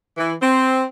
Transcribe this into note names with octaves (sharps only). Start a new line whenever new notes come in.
E3
C4